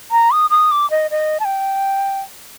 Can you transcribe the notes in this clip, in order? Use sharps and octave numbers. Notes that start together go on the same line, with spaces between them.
A#5
D#6
D#6
D6
D#5
D#5
A5
G5